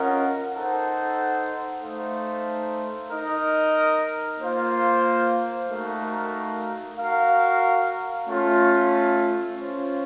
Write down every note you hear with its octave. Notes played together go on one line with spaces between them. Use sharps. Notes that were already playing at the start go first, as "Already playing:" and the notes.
Already playing: C#4 F4 A#4 D#5 F#5
D#4 A4 C5 F#5
A3 D#4 A4 C5 F5
D#4 A#4 D#5
A#3 F4 C5 F5
A3 D#4 F#4 A#4 F5
F#4 A#4 F5
A3 C#4 F4
C#4 F4 C5